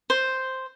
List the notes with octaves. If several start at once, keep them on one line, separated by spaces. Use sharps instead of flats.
C5